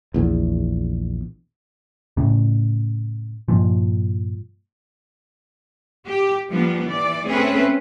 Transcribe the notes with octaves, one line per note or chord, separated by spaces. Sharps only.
A#1 E2
A2 C#3
G2 A#2 F3
G4
F3 G3 A#3 B3 D4
E3 D5
A3 C4 C#4 G#4 B4